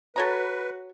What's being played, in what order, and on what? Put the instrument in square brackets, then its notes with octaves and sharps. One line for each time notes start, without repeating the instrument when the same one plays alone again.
[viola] F#4 [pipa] A4 C#5 A#5 [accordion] B4